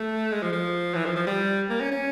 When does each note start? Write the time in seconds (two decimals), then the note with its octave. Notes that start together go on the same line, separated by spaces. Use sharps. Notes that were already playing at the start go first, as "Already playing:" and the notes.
Already playing: A3
0.32 G#3
0.42 F3
0.53 F3
0.95 E3
1.06 F3
1.16 F3
1.27 G3
1.69 A#3
1.80 C#4
1.91 C#4